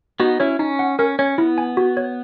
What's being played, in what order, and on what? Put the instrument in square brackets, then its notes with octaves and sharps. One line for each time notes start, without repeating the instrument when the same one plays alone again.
[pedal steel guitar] B3 D#4 [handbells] F#4
[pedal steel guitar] C#4 E4 [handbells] C#5
[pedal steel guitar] C#4 [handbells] D#4
[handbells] F#5
[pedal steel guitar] C#4 [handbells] A#4
[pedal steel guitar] C#4 [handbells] C#5
[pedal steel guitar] B3 [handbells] E4
[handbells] G#5
F#4
C#5